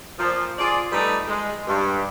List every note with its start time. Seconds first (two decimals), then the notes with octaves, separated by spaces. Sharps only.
0.19 A#2 F3
0.58 F4 G#4 D5
0.92 G3 A3 D#4 A4 B4
1.28 G#3
1.67 G2